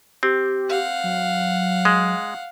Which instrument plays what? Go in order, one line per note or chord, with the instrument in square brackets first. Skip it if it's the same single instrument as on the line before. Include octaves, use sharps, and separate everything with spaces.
[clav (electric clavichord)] C4 [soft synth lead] G4
[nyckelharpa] F5 F#5
[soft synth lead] F#3
[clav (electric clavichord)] G#3